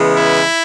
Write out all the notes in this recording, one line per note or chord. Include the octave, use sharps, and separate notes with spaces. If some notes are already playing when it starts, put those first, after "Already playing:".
Already playing: C#3 E3 G#3 B3
E4